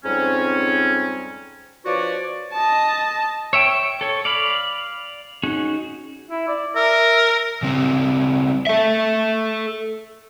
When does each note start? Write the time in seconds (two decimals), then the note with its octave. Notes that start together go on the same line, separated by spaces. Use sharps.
0.04 F2 G#2 G3 C4 C#4
1.86 F3 D4 F#4 B4 C#5 D5
2.53 D#5 A5
3.53 C#5 E5 G5
4.01 A4 C#5
4.25 D5 F5 B5
5.44 C#4 D#4 F#4 G#4
6.30 E4
6.48 D5
6.75 A#4 E5
7.63 C#3 G3 C4
8.67 A4 E5